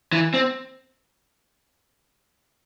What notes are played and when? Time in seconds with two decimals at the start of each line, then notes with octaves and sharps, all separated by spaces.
0.13 E3
0.34 C4